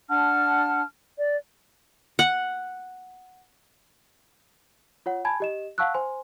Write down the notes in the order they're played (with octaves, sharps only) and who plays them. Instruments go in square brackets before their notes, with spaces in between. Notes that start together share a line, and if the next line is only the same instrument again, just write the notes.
[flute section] D4 F#5 A5 F6
D5
[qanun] F#5
[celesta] F4 C#5 F#5
G#5 A5 B5 G#6
G4 D#5 E7
F5 F#5 A5 C#6 E6 F#6
C5 G#5 C6